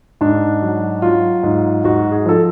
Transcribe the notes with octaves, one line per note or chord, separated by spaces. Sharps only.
G#2 D4
F#3
F#3 F4
G#2
G#2 F#4
G#4
F3 A4